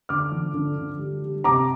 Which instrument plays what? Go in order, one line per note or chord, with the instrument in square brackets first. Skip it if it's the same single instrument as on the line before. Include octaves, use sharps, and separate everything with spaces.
[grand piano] D3 D6 F6
F3
D3
D3
G3
G3
C3 A#5 D6